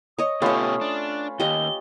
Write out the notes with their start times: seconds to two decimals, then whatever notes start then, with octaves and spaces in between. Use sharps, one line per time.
0.19 C#5 D#5 D#6
0.42 B2 A3 C#4 F4 G4 B4 C#5
0.81 D4
1.40 D#2 G4 D#5 G7